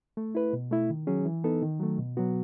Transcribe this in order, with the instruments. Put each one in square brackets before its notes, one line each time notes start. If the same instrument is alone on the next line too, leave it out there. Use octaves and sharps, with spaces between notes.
[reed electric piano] A3
E4 B4
B2
A3 E4
D#3
F#3 C#4 G#4
E3
B3 D#4 A4
D#3
F#3 A3
B2
F#3 B3 F#4